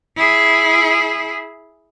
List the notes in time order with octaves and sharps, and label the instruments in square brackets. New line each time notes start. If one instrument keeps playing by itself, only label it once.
[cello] E4 G#4